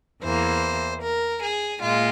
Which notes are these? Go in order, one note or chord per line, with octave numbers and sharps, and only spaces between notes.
E2 E3 A#3 C5
A#4
G#4
A#2 G#3 F4